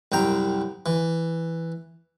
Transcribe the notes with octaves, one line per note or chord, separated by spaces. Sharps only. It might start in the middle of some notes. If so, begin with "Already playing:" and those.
C2 F#2 G5 A#5
E3